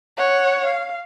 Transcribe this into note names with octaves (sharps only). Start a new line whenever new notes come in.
C#5 F#5
F5